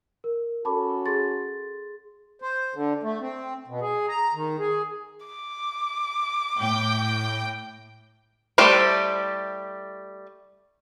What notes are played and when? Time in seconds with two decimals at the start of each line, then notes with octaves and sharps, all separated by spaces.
0.24 A#4
0.65 C#4 F#4 A4 A5 B5 D6
1.06 G#4 C6 A6
2.42 C5
2.75 D3
3.03 A3
3.21 C4
3.68 B2
3.81 G#4
4.09 A#5
4.34 D#3
4.59 G#4
5.26 D6
6.57 A2 G5
8.58 G3 A3 E4 G4 C5